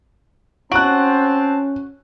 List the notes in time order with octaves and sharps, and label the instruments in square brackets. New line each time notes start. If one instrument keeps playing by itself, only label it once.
[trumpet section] C4 A5 [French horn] C#4 [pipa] F#4 [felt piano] F#6 D7